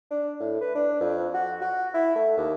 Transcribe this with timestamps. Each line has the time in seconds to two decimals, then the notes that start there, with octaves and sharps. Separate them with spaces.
0.11 D4
0.40 A2
0.61 B4
0.75 D4
1.00 F2
1.34 F#4
1.61 F#4
1.94 E4
2.15 A3
2.37 D#2